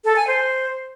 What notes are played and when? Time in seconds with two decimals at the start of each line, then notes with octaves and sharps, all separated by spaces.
0.05 A4
0.16 G#5
0.27 C5